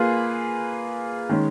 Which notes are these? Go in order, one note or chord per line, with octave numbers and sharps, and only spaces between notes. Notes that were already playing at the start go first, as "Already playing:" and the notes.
Already playing: A#3 F4 G#4 B4
D#3 G#3 C#4